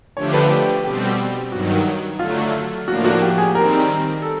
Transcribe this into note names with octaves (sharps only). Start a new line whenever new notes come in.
D3 F3 A3 D4 G4 C#5
B4
G4
B2 G3 C4 G4
G2 D#3 F#3 F#4
D3 F#3 A3 F4
A2 F3 A#3 D4 F#4
F#4
G4
G#4
D#3 G3 C4 A#4
A4